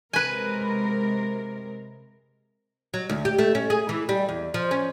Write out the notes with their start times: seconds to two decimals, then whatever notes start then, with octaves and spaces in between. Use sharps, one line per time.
0.13 C3 G#3 A#4 B4 G#5
2.94 F#3
3.09 D2
3.25 G4
3.39 A3
3.55 C#4
3.70 G#4
3.89 E3
4.09 G3
4.29 E2
4.54 F3
4.71 C#4